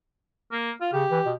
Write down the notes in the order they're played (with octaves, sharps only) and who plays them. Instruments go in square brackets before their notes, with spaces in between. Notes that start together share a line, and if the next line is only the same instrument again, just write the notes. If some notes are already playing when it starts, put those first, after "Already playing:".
[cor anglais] A#3
F4
[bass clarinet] C#3 [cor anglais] G4
[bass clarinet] E3
B2